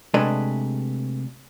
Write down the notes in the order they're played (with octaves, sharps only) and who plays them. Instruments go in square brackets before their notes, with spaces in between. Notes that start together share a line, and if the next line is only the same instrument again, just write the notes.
[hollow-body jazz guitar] C3 G#3 A3 D4 B4 D#5